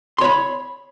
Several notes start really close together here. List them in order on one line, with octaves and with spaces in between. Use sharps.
C6 C#5 B5